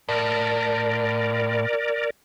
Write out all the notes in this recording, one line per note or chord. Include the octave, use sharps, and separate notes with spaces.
A2 A#4 D5